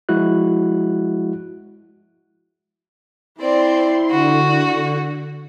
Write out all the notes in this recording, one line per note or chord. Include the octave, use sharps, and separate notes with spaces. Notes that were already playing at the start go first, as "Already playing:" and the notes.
F3 G#3 E4 F#4 F#6
C4 E4 D5 C6
D3 F#4